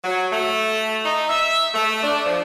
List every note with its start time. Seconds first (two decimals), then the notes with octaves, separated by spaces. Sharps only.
0.04 F#3
0.32 A3
1.05 D#4
1.30 E5
1.74 A3
2.03 D4
2.25 F3